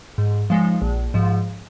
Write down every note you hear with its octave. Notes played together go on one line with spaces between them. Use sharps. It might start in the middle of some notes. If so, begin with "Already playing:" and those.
G#2
F3 G#3 D#4
A#1
G#2 F3